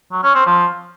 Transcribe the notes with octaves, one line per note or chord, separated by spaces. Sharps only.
F#3
C#4
C4
F3